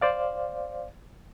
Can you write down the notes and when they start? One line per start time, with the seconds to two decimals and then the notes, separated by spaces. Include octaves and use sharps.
0.01 C5 D5 F5